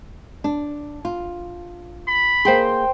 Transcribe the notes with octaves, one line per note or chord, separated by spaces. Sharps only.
D4
F4
B5
A#3 G#4 C5 G5 C6